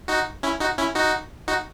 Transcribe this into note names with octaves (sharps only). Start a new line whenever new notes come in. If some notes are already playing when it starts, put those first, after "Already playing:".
D#4 F#4
C#4 E4
D#4 F#4
C#4 E4
D#4 F#4
D#4 F#4